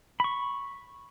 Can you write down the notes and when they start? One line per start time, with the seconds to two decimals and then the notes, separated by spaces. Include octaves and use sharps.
0.20 B5 C#6